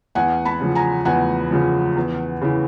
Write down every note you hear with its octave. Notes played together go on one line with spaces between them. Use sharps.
E2 F#5 G#5
A5 B5
C#3 F3
G#5 A#5
E2 F#5 G#5
C#3 F3
E2
C#3 E3